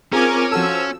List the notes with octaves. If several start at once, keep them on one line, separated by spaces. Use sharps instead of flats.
C4 C#4 F4 G#4 A#4 G#5 D6
F3 F#4 A4 E6